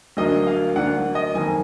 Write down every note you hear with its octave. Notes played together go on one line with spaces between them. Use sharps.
D2 D3 F#3 A#3 D4 D#5
F5
D2 D3 F#3 A#3 D4 F#5
D#5
F#1 F2 D#3 A#3 G#5